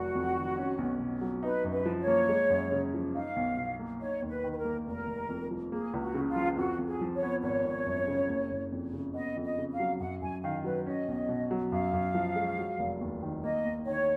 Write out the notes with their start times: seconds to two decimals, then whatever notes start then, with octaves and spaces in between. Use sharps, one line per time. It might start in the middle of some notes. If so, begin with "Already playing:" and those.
Already playing: F1 F#3 F#4
0.15 F2
0.36 D#3
0.58 C#4
0.78 B1
1.00 B2
1.21 F#3
1.43 D#4 B4
1.64 F#2
1.71 B4
1.85 F3
2.00 C#5
2.07 A#3
2.29 G#3
2.50 F#2
2.72 C#3
2.94 F3
3.15 D#4 F5
3.36 B1
3.57 B2
3.79 A#3
4.01 D#4 C#5
4.22 D#2
4.29 B4
4.44 D#3
4.52 B4
4.57 A#4
4.64 A#3
4.86 F1 A#4
5.07 F1
5.29 F2
5.51 F3
5.72 A#3 G#4
5.93 C#2
6.00 F#4
6.14 C#3
6.28 F4
6.36 F3
6.57 F2 F#4
6.79 F2
6.86 G#4
7.01 F3
7.15 C#5
7.22 B3
7.43 G#1 C#5
7.65 G#1
7.86 F#2
8.07 C#3
8.29 F#1
8.51 F#1
8.72 F2
8.93 C#3
9.15 B3 D#5
9.36 F2
9.44 D#5
9.58 C#3
9.72 F5
9.80 F#3
10.00 F#2 F#5
10.21 F#2 G#5
10.43 D#3 F5
10.64 F#3 B4
10.86 C#4 D#5
11.08 B1
11.28 B2
11.51 F#3
11.72 F#2 F5
11.93 F#2
12.14 F3
12.36 G#3
12.58 F#3
12.79 F1
13.01 D#2
13.23 D#3
13.44 A#3 D#5
13.65 D#2
13.87 D#3 C#5